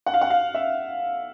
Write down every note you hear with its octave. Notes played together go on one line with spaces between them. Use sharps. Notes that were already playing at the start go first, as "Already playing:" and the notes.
F#5
F5
F#5
F5
E5